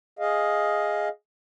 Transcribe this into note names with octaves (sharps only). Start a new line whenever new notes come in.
G#4 D#5 F5